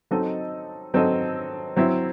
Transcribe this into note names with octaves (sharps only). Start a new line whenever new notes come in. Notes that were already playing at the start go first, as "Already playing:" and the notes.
F#3 C4 D#4 A4 D#5
F#3 C4 D#4 A4 D#5
F#3 C4 E4